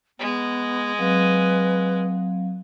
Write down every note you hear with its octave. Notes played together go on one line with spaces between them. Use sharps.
G#3 B3
F#3 C4 B4 F5